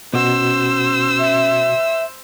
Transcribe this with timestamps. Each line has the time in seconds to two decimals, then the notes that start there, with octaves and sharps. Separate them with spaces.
0.13 B2 C#4 F#4 C5 E6
1.19 E5